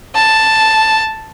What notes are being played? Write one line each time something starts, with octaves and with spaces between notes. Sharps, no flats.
A5